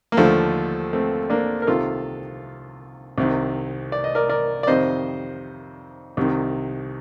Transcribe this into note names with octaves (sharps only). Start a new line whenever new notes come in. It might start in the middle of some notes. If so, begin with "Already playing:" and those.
A#3
D#2 D3 F3 A3
A3 C4
A#3 D4
A#4
C2 C3 D#3 F4 A4
C2 C3 D#3
D5
D#5
A#4 D5
A#4 D5
D5
F2 C3 D#3 C5 D#5
C2 C3 D#3